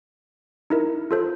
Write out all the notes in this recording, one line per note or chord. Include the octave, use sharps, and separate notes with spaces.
D#4 E4 A#4
F4 A4 C5